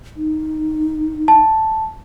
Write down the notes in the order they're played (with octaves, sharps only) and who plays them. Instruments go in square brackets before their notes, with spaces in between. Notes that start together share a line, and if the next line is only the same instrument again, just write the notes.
[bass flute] D#4
[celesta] A5